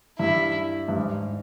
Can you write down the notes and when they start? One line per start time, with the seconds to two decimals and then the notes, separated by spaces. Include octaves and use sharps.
0.19 G2 E4
0.88 G2
0.96 G#2